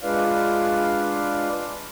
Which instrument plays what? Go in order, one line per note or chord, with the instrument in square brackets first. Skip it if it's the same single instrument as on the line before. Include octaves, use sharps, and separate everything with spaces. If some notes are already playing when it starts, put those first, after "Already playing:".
[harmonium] G#3 D4 F4 B4 D5 F5